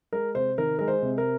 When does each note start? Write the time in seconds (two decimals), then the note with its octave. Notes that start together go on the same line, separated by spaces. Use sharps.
0.12 G#3 A#4
0.35 C3 C5
0.58 D#3 A#4
0.79 G#3 A#4
0.88 C5
1.02 C3
1.18 A#4